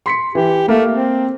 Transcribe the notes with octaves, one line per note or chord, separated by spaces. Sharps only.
C6 B6 C#7
E3 G4
A3 A#3 F5
C4